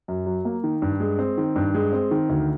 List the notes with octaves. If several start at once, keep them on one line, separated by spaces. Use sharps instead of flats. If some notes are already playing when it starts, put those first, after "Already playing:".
F#2
F#3
A#3
D#3
G2
G#3
C4
D#3
G2
G#3
C4
D#3
D2